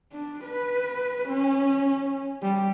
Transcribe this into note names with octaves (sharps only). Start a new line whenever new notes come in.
D4
B4
C#4
G3